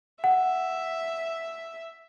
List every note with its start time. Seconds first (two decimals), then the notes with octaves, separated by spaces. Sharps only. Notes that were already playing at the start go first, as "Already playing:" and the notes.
0.24 E5 F#5